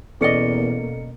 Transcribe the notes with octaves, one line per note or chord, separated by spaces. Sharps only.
E2 B2 A#3 C#4 A4 D5 D#5 C#7